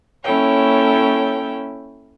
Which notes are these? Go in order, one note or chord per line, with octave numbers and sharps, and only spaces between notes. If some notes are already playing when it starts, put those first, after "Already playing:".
A#3 C#4 E4 A4 C#5 G5